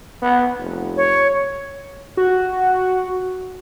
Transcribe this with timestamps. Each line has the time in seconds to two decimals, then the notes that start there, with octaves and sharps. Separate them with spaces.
0.22 B3
0.59 F1
0.97 C#5
2.17 F#4